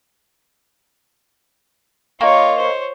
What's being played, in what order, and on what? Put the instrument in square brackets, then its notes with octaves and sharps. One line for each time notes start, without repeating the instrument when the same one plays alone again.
[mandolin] A#3 [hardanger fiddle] F4 C#5 [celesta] D#5 C#6
[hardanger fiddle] C5 C#5